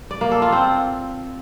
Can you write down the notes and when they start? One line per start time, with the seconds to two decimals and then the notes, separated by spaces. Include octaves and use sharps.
0.11 D5
0.21 A#3
0.32 A4
0.42 F4
0.52 C4